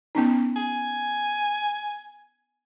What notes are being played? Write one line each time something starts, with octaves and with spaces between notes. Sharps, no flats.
B3 C#4 D#4
G#5